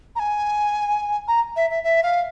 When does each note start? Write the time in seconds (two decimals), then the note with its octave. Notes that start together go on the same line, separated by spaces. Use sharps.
0.16 A#5
0.19 G#5
1.28 A#5
1.56 E5
1.70 E5
1.84 E5
2.03 F5